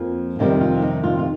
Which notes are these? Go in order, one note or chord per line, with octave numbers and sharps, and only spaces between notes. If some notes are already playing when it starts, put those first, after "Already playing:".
Already playing: F2 F3 A#3
F2 C3 D#3 G3 D#4
F4
D#4
F4
F4